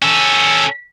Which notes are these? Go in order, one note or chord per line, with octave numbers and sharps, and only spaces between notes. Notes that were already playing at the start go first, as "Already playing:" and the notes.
C#4 A4